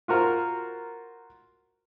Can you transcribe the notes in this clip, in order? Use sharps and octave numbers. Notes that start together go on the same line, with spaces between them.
F4 F#4 A#4 C5